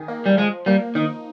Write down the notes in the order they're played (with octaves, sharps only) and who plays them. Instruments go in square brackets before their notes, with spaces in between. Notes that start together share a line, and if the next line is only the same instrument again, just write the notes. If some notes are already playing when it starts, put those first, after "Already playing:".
Already playing: [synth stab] D#3 G#4
A#3
[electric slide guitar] G3
[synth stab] F3 [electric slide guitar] G#3
[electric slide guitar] G3 [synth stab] A#3
[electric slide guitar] D#3 [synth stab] D#4